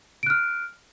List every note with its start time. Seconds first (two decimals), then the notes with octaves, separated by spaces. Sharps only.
0.23 D7
0.26 F#6
0.30 F6